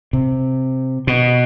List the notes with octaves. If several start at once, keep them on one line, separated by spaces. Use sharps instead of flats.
C3
B2